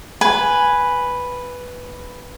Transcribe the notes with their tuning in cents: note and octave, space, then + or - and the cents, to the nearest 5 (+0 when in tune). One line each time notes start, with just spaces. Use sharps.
B4 +0 G#5 +0